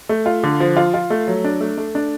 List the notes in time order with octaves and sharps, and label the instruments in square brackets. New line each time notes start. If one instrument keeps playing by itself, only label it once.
[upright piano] A3
F4
D3
F3
F4
F4
A3
F#3
D4
A3
A3
D4